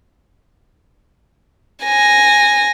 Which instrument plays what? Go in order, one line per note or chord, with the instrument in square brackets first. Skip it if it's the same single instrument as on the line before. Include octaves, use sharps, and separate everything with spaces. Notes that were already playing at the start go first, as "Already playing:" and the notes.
[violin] G#5 A#6